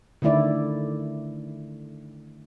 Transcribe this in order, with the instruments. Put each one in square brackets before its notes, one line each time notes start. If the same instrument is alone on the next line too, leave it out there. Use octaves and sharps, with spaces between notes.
[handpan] D3 D#3 A3 E4 D5